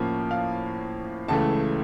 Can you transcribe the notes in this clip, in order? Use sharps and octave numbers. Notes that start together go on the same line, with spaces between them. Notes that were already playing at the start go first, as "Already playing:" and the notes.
Already playing: A2 F3 A#3 C#4
F5
C#2 C#3 E3 A3 A5